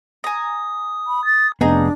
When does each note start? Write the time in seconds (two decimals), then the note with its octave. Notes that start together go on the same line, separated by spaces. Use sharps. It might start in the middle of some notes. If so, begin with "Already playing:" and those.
0.24 G#5 A#5 D#6
1.07 B5
1.25 A6
1.61 F1 B3 D4 D#4 G#4 A#5